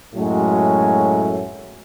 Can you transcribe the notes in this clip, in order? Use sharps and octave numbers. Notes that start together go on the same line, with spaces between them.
F#2 A2 F#3 G#3 A3 C#4